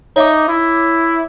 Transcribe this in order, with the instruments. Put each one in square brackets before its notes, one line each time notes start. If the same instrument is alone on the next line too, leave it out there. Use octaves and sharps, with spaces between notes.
[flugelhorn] D#4 [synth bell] C#5 E5 D6
[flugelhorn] E4